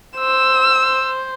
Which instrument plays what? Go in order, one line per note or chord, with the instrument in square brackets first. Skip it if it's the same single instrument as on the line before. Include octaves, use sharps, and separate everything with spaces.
[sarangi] C5 [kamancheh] E6